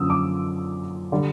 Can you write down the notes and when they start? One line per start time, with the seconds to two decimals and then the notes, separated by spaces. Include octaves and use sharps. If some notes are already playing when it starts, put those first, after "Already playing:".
Already playing: F#2 D3 F3 A#3 C#4 D#6 E6
0.10 D6
1.12 D3 G3